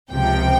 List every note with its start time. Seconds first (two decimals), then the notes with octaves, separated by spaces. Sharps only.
0.11 C#2 C3 F3 G5